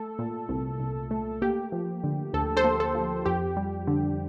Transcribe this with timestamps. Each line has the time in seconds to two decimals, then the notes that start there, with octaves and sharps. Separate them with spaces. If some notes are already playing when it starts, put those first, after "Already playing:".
Already playing: A3 A4
0.19 A#2
0.49 C2
0.80 C2
1.11 A3
1.42 A#3 G4
1.72 F3
2.04 D3
2.33 D2 A4
2.57 A4 C5
2.64 A#3
2.80 A4
2.95 F3
3.26 F2 G4
3.57 G3
3.87 D3